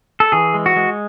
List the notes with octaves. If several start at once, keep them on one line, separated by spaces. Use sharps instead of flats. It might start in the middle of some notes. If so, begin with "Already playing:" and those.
A4
E3 G#4
G#3
F#4
G#3